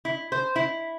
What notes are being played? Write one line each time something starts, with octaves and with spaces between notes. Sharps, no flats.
E4
C5
E4